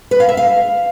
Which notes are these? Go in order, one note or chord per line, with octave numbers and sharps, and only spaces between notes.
B4
F5
E5
F5